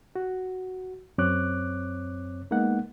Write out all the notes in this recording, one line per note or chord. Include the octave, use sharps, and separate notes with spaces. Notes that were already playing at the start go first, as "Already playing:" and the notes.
F#4
F#2 C4 C#5 D6 F#6
G#3 A#3 B3 D#4 F#5